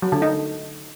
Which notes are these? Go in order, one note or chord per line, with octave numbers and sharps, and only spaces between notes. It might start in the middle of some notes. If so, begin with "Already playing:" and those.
F#3
D3
D#4